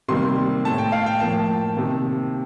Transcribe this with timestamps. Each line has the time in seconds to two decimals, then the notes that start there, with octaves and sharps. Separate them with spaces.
0.08 C3 D#3 G3 A#3 C6
0.65 A2 A3 A5
0.78 G5
0.92 F5
1.06 G5
1.20 A2 F3 A#3 A5
1.76 C3 D#3 A#3